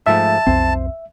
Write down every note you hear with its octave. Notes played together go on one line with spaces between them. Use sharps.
G#2 F3 A3 E5 A5
B1 F2 C4 C5